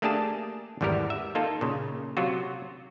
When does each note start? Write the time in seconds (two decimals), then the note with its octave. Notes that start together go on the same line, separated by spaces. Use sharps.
0.02 A3 A#3 D4 G4 G#4 A5
0.81 G#1 E2 G3 B3 G4 A#4
1.10 E5
1.35 A#3 D#4 F4 A4
1.61 A#2 C#3
2.17 C3 F#3 F4 F#4